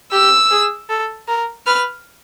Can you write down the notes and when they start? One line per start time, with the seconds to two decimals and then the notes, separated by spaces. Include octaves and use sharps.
0.12 G4 E6
0.51 G#4
0.90 A4
1.28 A#4
1.66 B4 F6